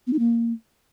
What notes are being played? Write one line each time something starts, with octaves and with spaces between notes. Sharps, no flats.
B3
D#4
A#3